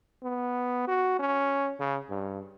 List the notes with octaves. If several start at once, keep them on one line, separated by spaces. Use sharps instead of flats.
B3
F#4
C#4
C#3
G2